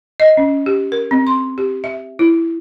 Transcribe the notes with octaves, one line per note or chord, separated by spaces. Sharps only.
D#5
C#4
G4
A#4
C4
C6
G4
E5
E4